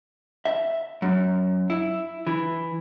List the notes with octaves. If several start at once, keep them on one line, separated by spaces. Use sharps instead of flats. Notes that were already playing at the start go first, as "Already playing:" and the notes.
E5
F#2
E4
E3